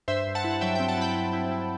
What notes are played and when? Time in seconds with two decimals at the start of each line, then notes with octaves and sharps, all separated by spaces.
0.08 G2 C5 E5
0.27 G2
0.35 F#5 A5
0.44 E4
0.51 F#5
0.61 F#3 E5 G5
0.75 C4 E5 G5
0.88 F#5 A5
0.98 E4 G5 B5
1.15 E4
1.33 E4
1.51 E4